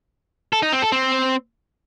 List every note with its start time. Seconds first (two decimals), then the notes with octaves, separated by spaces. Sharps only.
0.53 A4
0.63 D#4
0.72 C4
0.82 A4
0.92 C4